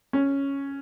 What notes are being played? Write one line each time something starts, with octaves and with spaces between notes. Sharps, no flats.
C#4